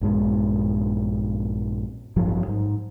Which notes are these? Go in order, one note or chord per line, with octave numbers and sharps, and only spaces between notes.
A#1 G2 G#3
A1 G2 F3 F#3
G#2